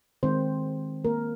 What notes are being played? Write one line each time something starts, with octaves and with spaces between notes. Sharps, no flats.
D#3 G#3 C4 C5
A#3 A#4